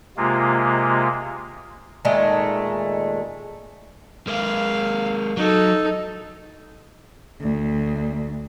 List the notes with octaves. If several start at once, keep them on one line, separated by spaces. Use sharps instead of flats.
C3 G#3 A#3 F4
A#2 D#3 G#3 A3
G#3 A#3 F5
F#3 D#4 A4
D2